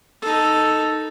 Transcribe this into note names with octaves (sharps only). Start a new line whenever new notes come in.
D#4 A4